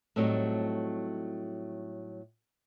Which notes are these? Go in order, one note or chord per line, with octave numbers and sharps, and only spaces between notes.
A2 F#3 G3 A3 C4 D#4